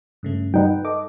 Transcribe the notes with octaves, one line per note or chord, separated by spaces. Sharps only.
G2 C#3 A3
G2 D#4 B4 F#5 G5
A4 D#5 D6